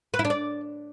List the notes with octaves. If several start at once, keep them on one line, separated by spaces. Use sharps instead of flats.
B4
E4
D4
D5